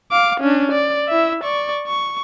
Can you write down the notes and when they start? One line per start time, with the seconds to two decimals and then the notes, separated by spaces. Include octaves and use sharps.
0.11 F5 D6
0.41 C#4 D4
0.72 D5
1.09 E4 E5
1.44 D5 C#6
1.87 C#6